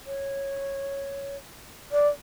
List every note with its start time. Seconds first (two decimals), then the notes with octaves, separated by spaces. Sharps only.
0.06 C#5
1.92 D5